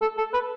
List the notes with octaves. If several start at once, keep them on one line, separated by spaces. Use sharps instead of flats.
A4
A4
B4